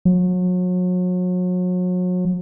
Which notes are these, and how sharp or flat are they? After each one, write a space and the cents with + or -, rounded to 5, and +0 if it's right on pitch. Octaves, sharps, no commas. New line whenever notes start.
F#3 -35